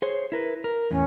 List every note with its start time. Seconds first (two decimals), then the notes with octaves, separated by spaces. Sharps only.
0.02 G#4 C5 C#5
0.32 E4 A#4 B4
0.64 A#4
0.91 E2 A2 C#4